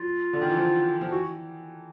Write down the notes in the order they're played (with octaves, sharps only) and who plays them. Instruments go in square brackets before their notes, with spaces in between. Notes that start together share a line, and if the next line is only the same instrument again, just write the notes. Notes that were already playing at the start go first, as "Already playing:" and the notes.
Already playing: [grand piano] F#3 [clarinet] F4
[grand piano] D3
D#3
E3
F3
F3
[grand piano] E3 [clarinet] F#4